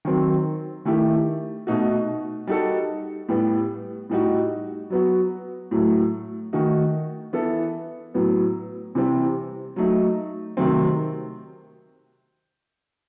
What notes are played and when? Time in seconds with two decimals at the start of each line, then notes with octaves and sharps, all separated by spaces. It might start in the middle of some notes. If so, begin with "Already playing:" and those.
0.05 D#3 F#3 C4
0.85 D#3 A3 E4 G4
1.67 B2 A3 D#4 F#4
2.47 G3 D#4 F#4 A4
3.29 A2 G3 B3
4.10 A2 G3 D#4 F#4
4.90 F#3 B3 F#4
5.71 A2 F#3 A3
6.53 D#3 A3 D#4 F#4
7.33 E3 B3 E4 A4
8.14 A2 F#3 B3
8.95 C3 E3 G3 C4
9.76 F#3 A3 D#4
10.57 C3 D#3 F#3 A3 C4